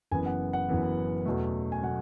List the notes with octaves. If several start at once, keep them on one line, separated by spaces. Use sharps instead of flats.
F#1 F#2 E3 B3 G#5
F#5
F#5
F#1 F#2 E3 B3
E2 B2 F#3 A3
G#5
B2 F#3 A3 F#5